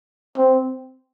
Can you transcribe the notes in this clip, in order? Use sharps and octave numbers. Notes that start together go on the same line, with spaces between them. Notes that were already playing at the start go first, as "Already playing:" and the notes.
C4